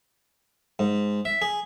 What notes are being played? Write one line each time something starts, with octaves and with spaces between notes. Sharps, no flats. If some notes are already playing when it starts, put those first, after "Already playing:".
G#2
E5
G#4